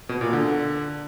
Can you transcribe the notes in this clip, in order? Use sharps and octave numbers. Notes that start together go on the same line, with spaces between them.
B2
A#2
D3